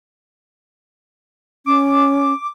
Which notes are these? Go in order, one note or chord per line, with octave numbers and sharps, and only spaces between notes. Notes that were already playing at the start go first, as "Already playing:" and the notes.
C#4 D6